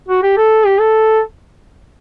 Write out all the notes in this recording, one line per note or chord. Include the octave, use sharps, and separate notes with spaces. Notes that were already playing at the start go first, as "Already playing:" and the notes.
F#4
G4
A4
G4
A4